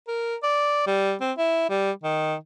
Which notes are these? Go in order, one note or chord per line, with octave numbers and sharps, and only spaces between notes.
A#4
D5
G3
C4
E4
G3
D#3